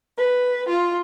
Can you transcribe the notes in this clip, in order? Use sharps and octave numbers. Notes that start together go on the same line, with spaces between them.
B4
F4